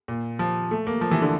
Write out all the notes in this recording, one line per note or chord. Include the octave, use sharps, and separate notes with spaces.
A#2
F3
A3
A#3
F3
E3
D3